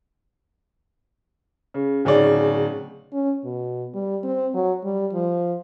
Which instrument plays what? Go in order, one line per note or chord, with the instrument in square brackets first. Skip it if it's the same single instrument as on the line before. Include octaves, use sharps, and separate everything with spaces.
[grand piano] C#3
D1 C#3 C#4 D#4 D5
[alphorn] C#4
B2
G3
C4
F#3
G3
F3